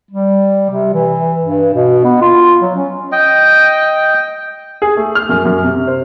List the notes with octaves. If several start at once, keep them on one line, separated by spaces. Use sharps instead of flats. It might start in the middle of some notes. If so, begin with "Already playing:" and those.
G3
C3
E3
G2
B2
B3
F4
F#3
C#4
D#5 G5
G#4
A3
F6
F#2
F#2
C3
C5